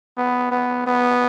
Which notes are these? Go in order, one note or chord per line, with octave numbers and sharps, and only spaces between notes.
B3
B3
B3